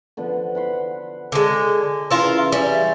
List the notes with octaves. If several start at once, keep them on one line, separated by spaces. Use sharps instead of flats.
D3 F3 B3
F#5 B5 C6
D3 G#3
C#3 E3 E4 F4 A#4
G3 C#4 D5 E5